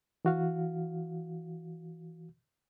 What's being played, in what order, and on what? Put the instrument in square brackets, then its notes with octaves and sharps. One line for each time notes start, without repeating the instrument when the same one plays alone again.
[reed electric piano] E3 F#4 F5